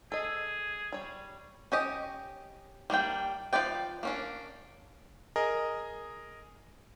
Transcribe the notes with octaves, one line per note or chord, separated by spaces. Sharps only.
G#4 A4 D#5
G3 C#5
C#4 G4 D#5
G3 A#3 D4 G5
F3 F4 B4 D5 G5
A#3 C#4 D4
G#4 A#4 D#5